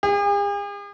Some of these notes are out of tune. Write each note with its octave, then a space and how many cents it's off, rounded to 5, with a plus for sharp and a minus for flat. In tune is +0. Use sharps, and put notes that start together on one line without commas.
G#4 -45